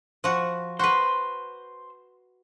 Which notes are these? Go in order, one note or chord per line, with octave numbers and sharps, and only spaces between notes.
F3 F#4
F#4 B4 C5